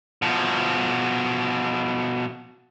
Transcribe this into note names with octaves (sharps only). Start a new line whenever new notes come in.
B2 F3